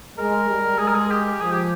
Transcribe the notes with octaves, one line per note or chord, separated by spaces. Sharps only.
G#3 A#4
G3
G#3 G#4
A#4
G#4
G4
F3 G#4
G4